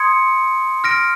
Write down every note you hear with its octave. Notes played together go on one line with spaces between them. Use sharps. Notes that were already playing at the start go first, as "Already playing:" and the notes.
Already playing: C6 D#6 G#6 C#7
F6 A#6 D7